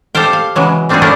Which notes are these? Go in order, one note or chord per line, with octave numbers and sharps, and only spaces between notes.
G4 A4 C5 F5 G5
F5
C#3 E3 F#3 G#3
G3 C4 D4 F4 F#4 G#4
A3 C#4 D4 E4 F4 A#4